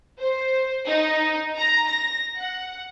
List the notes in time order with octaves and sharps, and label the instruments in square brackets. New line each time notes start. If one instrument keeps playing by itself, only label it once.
[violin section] C5
D#4
A#5
A#6
F#5